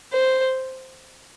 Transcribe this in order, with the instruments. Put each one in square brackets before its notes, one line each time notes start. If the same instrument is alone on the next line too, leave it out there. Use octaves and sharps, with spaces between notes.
[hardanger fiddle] C5